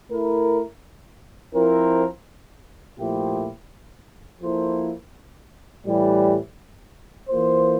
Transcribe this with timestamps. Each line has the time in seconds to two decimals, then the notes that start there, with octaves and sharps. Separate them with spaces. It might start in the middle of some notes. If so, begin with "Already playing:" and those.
0.10 A3 E4 A#4
1.54 F3 C4 E4 A#4
2.98 A#2 F3 A3 E4 G4
4.41 F3 A#3 E4 A4 C5
5.85 A2 E3 G3
7.29 E3 A#3 F4 C5